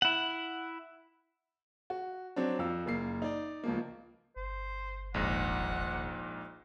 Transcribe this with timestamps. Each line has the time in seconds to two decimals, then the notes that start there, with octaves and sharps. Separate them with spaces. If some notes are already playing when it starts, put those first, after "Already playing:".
0.02 E4 F#5
1.90 F#4
2.36 F#3 C4 D4
2.59 F2 F5 E6
2.86 F#1 A#3 C7
3.22 D#4 D5
3.64 C#2 F3 A#3
4.36 G1 C5
5.14 D#1 A#1 G#2 F#5